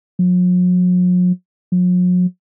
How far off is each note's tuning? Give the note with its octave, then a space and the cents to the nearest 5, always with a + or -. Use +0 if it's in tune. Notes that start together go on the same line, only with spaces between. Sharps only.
F#3 -45
F#3 -45